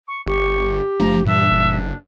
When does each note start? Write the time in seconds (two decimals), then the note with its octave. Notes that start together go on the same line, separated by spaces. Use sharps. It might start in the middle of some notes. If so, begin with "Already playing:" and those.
0.07 C#6
0.26 G1 G4 C#6
1.00 F#1 F3 A3 D4 A#5
1.25 G2 A#2 E3 G3 D4 E5
1.51 F#1